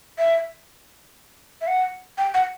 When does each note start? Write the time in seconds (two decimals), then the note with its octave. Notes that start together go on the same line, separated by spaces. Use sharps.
0.19 E5
1.61 E5
1.67 F#5
2.18 G5
2.34 F#5